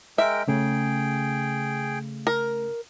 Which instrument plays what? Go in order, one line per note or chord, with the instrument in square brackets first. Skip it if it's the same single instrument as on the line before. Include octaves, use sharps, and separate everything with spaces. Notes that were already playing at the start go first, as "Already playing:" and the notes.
[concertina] G#3 A#4 G5 [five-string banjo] E5
[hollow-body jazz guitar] C#3 [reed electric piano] A3 [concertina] G#4 G5
[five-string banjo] A#4